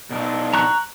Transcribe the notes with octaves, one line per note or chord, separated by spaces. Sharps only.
B2 D4 D#4
A#5 C#6 F#6